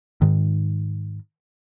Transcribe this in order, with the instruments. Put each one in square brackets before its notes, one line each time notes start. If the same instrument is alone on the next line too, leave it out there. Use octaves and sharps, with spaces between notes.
[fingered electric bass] G#2 D#3